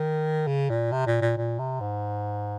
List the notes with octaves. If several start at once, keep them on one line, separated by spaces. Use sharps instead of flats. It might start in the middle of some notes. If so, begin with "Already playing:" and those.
Already playing: D#3
C#3
A#2
C3
A#2
A#2
A#2
C3
G#2